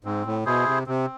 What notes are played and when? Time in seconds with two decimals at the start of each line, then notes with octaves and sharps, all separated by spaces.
0.04 G#2 C4
0.26 A2
0.46 B2 E4 G#4 C5
0.66 C3
0.86 C3 C4